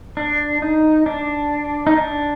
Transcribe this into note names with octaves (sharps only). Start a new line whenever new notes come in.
D4
D#4
D4
D#4
D4